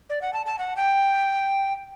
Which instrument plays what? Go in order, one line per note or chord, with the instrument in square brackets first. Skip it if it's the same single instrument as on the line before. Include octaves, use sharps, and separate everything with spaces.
[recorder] D5
F#5
A5
A5
F#5
G5